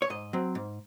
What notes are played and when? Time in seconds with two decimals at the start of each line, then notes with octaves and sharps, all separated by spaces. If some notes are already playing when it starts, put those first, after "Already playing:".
0.02 C#5
0.10 G#2 D#5
0.33 F#3 C4
0.55 G#2